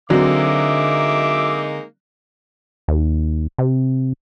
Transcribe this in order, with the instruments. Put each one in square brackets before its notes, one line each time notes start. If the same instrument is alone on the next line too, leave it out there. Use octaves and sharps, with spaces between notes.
[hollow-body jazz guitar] D3 C4 [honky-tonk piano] F#3 [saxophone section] G#3 A#3 D#4 [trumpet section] E5 D6
[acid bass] D#2
C3